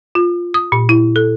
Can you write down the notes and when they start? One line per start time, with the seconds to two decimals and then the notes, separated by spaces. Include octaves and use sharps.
0.15 F4
0.54 D#6
0.72 A#2
0.89 E4
1.16 A4